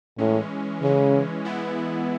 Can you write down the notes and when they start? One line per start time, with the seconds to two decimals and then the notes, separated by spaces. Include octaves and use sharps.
0.18 A2 E3 G#3 C#4
0.82 C#3 E3 G#3 C#4
1.45 E3 G#3 B3 E4